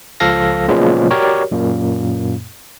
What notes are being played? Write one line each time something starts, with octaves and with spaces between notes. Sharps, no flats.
C#2 F3 A4 F5 A#6
A#2 C#3 F3 F#3 G#3 B3
F#4 G4 A#4 C#5 D5
F#2 A#2 A#3